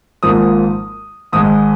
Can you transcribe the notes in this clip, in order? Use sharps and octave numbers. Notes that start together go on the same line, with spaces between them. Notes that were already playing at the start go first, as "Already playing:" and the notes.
G#1 G#2 F3 A#3 D#6
G#1 G#2 G#3 D#6